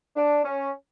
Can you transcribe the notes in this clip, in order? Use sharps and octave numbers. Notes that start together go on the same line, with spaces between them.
D4
C#4